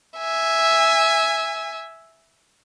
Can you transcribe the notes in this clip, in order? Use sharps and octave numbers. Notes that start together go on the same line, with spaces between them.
E5 G#5